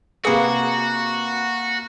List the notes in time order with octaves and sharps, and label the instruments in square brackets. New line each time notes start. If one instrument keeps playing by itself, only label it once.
[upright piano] C3 B4 G#5 [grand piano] A#3 C#7 [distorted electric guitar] F#4 [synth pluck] G#4 F5